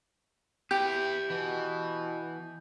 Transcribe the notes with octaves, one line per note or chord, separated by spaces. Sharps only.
B3 E4 G4 G6
B2 E3